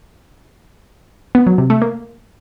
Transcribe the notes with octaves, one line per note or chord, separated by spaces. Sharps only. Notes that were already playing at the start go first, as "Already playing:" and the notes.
B3
F#3
C3
A3
A#3